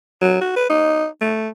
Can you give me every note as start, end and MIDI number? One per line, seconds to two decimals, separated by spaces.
0.22 0.38 54
0.41 0.55 66
0.56 0.68 71
0.70 1.06 63
1.21 1.48 57